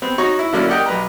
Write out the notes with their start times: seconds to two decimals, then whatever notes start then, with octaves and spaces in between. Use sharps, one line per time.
0.02 B3 C4
0.18 D#4 F#4 C#5 A#5 C#6
0.39 E4
0.53 D3 F#3 A#3 C#4 D4 E4
0.69 G4 A#4 D5 D#5 F#5 G5
0.86 B1 B4 A#5